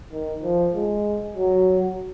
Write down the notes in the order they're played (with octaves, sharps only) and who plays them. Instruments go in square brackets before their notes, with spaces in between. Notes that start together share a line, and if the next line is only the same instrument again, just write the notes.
[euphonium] D#3
F3
G#3
F#3